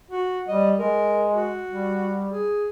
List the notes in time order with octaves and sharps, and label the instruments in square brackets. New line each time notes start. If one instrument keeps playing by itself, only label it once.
[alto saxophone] F#4
[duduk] G3 [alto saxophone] D#5
[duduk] G#3 [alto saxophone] A#4
[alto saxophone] F#4
[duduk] G3
[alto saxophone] G#4